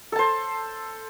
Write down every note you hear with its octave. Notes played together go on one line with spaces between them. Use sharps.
A4 C5 A5